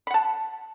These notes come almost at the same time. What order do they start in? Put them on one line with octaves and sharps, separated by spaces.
B5 F#5 A5